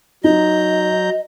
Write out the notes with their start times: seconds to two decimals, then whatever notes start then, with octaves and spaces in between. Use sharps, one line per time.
0.24 F#3 D#4 D#5 A#5 G6